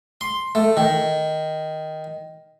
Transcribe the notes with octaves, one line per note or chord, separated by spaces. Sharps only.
C6
A3
D#3